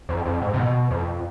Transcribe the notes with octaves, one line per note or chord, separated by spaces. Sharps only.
F2
F2
G#2
C3
B2
F2